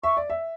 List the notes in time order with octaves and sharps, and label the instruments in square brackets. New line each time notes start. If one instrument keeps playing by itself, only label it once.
[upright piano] E5 [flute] C#6
[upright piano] D5
E5